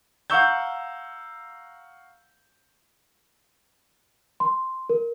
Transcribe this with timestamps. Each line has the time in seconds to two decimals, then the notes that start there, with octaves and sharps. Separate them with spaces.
0.30 F5 F#5 A#5 C#6 E6 G6
4.40 C6
4.90 A#4